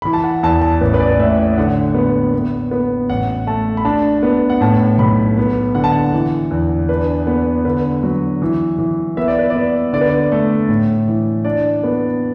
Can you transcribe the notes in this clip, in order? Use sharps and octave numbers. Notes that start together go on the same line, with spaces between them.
E3 B5
A5
F#5
E2 A5
A5
A1 B4
B4
D5
A2 E5
D3 F#5
B3
B3
B3
A1 F#5
A3 A5
B5
D4 A5
B3
F#5
A2 A5
B1 B5
B3
D3 F#5
A5
F#5
E3
E2
D4 B4
B3
D3 B4
F#3
E3
E3
B3 E5
D5
B4
B3 D5
D3 D5
B4
D5
A3
A2
E3
D4 D5
B3